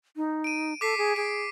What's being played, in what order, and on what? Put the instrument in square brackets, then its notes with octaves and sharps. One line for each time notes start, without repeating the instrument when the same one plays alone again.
[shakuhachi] D#4
[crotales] D7 D#7
[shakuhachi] A4 [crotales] D6 B6 C7
[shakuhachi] G#4
[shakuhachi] G#4 [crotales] D7